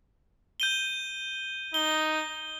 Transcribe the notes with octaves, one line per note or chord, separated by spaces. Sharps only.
G6 D#7 G7
D#4 G7